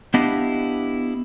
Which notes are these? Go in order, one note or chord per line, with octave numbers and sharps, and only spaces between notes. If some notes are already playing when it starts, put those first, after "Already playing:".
B3 D4 E4 G4 D#5 F5